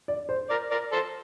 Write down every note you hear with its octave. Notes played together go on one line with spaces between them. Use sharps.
D5
C5
A#4 D5
A#4 D5
A4 C5